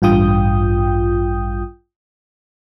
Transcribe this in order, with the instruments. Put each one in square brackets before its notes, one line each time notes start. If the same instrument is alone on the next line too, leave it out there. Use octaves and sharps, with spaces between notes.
[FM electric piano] A1 G2 F4 G5 D#6 G6